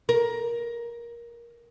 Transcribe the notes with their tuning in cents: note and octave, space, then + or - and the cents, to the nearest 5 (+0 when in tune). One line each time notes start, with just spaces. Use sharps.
A#4 +15